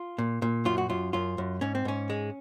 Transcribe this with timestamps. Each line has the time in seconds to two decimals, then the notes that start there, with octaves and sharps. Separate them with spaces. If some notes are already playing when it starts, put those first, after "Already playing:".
Already playing: F4
0.18 A#2
0.42 A#2
0.65 F#2 F4
0.78 F#4
0.90 F#2 F4
1.13 F#2 F4
1.38 F#2
1.61 G#2 C#4
1.75 C4
1.85 G#2 C#4
2.10 G#3